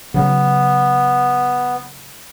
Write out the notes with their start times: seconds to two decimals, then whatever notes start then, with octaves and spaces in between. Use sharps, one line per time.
0.14 C#3 F#3 B3